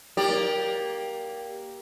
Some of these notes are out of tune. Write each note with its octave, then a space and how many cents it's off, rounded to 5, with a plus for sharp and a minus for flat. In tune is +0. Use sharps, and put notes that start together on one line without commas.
A#3 +10 G4 +0 D5 -5